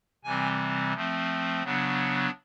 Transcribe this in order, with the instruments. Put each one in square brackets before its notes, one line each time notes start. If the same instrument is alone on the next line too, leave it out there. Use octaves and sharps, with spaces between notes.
[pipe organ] C3 E3 G3 C4 G#5
F3 A3 C4
C#3 F#3 B3 D4